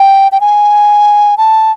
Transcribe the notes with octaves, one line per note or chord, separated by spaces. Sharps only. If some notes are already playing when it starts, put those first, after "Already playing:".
Already playing: G5
G5
G#5
A5